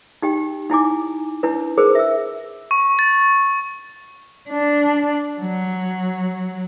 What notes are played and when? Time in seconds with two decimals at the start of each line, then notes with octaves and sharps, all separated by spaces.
0.22 D#4 G4 G5
0.70 D#4 E4 G#5 D6
1.43 D4 E4 B4
1.78 G#4 A#4 C5
1.95 E5 E6
2.71 C#6
2.99 A6
4.50 D4
5.41 F#3